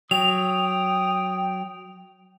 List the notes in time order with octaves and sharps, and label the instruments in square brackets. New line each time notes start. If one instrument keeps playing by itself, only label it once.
[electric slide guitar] F#3 [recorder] G5 [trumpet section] D#6 [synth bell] F7